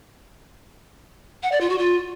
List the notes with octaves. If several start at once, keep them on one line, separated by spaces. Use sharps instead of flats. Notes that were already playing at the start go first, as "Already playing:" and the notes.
F#5
D5
F4
F#4
F4